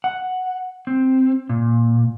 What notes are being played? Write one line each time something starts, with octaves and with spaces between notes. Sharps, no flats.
F#5
C4
A#2